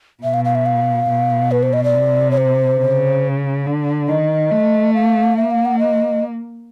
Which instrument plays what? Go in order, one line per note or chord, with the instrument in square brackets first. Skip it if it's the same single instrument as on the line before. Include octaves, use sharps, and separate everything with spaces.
[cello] B2 [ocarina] E5
[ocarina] F5
F5
E5
F5
[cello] B2
[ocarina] B4
C5
D#5
D5
[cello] C3
[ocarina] C#5
C5
[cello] C#3
D3
[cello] D#3 [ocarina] D#5
[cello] A3
[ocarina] F5
[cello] A#3 [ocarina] E5
[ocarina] F5
F#5
D#5